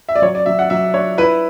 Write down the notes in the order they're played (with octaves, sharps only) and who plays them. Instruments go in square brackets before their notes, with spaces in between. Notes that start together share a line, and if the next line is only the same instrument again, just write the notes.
[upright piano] E5
D5
F#3 C#5
D5
F#3 E5
F#5
F#3 E5
D4 C#5
E4 B4